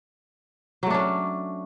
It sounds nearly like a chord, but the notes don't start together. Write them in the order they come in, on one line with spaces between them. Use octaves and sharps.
F#3 A3 D4 C#4